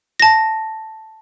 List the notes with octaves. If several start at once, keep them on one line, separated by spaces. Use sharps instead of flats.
A5 A#6